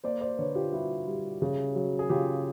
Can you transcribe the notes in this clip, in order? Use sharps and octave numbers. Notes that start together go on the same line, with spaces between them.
A#3 C5 D5
C5 D5
D3 B4 C#5
F4 G4
G3 E4 F#4
G3
C#3
F#3
G#4
C#3 F4 G4